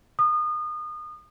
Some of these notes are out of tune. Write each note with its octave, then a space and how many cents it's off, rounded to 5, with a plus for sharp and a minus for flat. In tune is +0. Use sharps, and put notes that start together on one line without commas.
D#6 -30